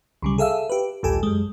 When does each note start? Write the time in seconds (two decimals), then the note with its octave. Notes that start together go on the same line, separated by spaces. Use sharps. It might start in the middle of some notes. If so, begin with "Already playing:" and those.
0.22 C2 C#3 G3
0.38 G#4 A4 E5 F5 E6
0.70 G4 B4
1.03 A#1 D#2 G#2 G4 A4 G#5
1.23 F#2 G#3